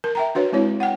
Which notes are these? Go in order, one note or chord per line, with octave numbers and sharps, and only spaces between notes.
A#4
E5 G5 A#5
D4 F#4 B4 C#5
G#3 C4 E4 C#5
F#5 G5